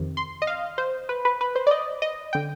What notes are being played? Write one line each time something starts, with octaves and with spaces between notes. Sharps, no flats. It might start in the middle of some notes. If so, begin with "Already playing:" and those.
Already playing: F2 C3 D#3
C6
D#5
F5
C5
B4
B4
B4
C5
D5
D#5
D#5
D3 G5